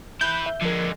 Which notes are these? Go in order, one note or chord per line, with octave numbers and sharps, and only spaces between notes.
E4 B4 G6
E5
D3 F3 G#3 A#4